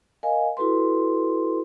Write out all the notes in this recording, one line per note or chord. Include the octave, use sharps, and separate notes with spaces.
A#4 D#5 F5 G#5
E4 F#4 A4 B4 C6